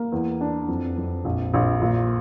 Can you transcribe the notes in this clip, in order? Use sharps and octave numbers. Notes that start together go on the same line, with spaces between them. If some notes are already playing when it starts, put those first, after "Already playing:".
Already playing: A#3
E2
D4
F2
F2
A#1
A#1
A#2